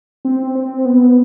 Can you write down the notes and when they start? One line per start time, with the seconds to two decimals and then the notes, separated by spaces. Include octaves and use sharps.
0.25 C4
0.55 C4
0.85 B3